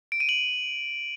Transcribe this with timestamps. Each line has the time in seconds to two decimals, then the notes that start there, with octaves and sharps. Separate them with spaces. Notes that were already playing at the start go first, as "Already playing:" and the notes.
0.12 D7
0.20 D#7
0.29 F#7